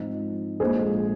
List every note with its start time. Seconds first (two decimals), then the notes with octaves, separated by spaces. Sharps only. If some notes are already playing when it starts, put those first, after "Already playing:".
Already playing: G#2 F3 C4 D#4
0.60 A#1 A#2 F3 G#3 G#4 C5